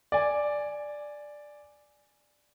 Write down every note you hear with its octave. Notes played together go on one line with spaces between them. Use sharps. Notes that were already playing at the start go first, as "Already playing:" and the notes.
D5 G#5